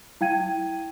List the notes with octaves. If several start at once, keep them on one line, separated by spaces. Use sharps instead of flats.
E4 F5 G5 G#6 D#7